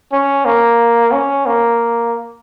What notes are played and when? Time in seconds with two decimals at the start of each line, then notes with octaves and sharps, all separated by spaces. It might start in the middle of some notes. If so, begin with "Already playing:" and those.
0.12 C#4
0.45 A#3
1.12 C#4
1.46 A#3